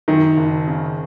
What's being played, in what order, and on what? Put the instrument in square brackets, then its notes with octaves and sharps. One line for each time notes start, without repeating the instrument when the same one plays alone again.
[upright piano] F#2 [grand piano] D#3
[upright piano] F#1
C#3